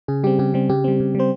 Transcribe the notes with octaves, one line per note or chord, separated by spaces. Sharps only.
C#3 G#4
G3 C4 G4
C#3 G4
G3 C4
C#3 G4
G3 C4
C#3
G3 C4 C5